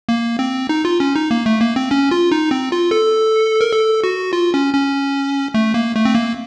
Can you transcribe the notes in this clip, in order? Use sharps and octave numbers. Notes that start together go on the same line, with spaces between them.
A#3
C4
D#4
F4
C#4
D#4
A#3
A3
A#3
C4
C#4
F4
D#4
C4
F4
A4
A#4
A4
F#4
F4
C#4
C#4
A3
A#3
A3
C4
A#3